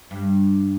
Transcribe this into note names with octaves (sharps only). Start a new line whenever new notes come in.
G2